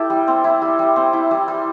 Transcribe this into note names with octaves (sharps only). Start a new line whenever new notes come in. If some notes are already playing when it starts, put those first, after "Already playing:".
Already playing: E4 G4 A4
G3
C4
E4
G3
G3
C4
E4
G3
G3